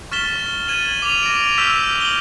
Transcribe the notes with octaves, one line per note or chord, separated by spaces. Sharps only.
C#6 F6 A6 B6 E7 G7
G#6 A6 D#7 E7 F#7
D6 D#7 F7
A#6 D7
C#6 E6 F6 G6 B6 E7
F#7 G7